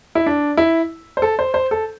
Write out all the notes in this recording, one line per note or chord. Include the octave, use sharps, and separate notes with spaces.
E4
D4
E4
C5
A4
C5
C5
A4